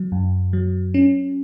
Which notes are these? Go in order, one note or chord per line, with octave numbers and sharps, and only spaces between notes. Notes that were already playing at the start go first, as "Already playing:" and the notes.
Already playing: F#3
F#2
F#3
C#4